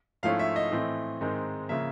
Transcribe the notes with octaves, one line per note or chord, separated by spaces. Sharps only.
G#2 F3 A3 C#4 E4 F5
E5
D#5
A2 E3 A3 C4
G#2 D#3 G#3 C4 D#4
C#3 F3 A#3 E5